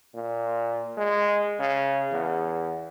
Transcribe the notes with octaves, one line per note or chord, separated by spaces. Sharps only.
A#2
G#3
C#3
E2